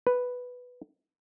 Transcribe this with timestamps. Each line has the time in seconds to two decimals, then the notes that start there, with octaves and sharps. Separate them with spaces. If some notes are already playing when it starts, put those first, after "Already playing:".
0.07 B4